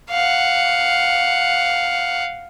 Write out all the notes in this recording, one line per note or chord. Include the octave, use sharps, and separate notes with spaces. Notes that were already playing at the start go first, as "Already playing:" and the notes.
F5 F#5